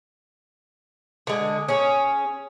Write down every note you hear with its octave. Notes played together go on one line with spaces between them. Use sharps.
D3 G#3
C#4 G#4